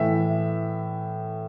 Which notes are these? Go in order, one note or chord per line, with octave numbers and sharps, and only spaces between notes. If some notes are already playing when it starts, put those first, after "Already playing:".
Already playing: A2 E3 E5